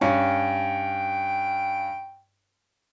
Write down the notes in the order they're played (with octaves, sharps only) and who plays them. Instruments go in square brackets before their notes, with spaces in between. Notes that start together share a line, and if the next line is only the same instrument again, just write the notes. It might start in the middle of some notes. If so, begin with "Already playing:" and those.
[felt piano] G2 C#4 [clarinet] G5